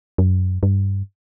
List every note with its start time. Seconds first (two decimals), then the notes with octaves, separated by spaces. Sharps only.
0.18 F#2
0.63 G2